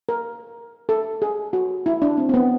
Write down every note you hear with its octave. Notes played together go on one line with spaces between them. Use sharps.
A#4
A4
G#4
F#4
E4
D4
C4
C4
B3